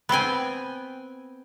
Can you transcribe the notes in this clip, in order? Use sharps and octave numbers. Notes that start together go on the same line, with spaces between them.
B3 C4 G5 G#5